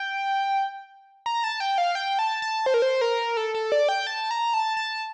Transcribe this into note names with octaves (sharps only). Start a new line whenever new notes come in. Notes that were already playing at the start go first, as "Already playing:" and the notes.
Already playing: G5
A#5
A5
G5
F5
G5
A5
A5
C5
A#4
C5
A#4
A4
A4
D5
G5
A5
A#5
A5
A5